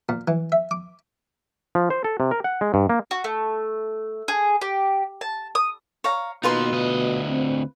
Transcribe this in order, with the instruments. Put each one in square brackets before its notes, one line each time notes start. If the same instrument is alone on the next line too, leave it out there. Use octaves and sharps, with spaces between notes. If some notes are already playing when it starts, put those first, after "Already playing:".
[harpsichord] A#2
E3
E5
D6
[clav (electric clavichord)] F3
C5
A4
C3
A#4
F#5
G#3
G2
A#3
[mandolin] F#4
A3
G#4
G4
A5
D#6
[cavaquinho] C#5 F5 A#5
[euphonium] B2 [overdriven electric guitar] A#3 D#4 [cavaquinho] F4 B4 C6
[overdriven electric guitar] D2 D#5
[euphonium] C4